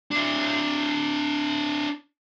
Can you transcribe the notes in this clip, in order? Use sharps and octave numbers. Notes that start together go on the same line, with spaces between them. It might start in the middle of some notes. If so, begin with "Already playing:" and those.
D4 E4